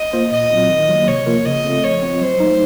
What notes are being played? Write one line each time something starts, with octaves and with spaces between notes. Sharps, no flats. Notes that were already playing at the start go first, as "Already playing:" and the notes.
Already playing: D#5
A#3 F4 C5
A#2 D#5
F#3 C4 F4
D#3
F#3 A#3
C3 C#5
F3 A#3 F4 A#4
C#3 D#5
A3 C4 F4 A4
F3 C#5
C4 F4
F#3 C5
A3 D#4